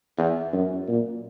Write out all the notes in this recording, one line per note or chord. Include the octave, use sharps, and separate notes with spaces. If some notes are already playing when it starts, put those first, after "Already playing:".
E2
F#2
A#2